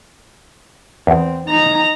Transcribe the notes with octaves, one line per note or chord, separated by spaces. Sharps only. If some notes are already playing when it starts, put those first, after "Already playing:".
E2 C4
D#4 A#5